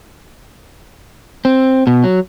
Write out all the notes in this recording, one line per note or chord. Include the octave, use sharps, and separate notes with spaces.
C4
B2
F#3